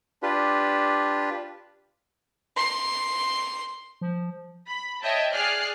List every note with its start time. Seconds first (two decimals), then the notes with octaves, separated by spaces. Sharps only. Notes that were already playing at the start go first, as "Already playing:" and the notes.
0.23 D4 F4 G4 B4
2.57 C6
4.01 F3
4.68 B5
5.03 C#5 D#5 E5 G5 A5
5.32 G#4 D5 F6 F#6 C7